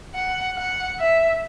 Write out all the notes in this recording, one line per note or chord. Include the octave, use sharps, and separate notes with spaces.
F#5
F#5
E5